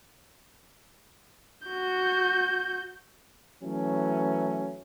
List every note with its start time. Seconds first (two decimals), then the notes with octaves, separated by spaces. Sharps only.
1.66 F#4 G6
3.61 E3 F#3 A3 C#4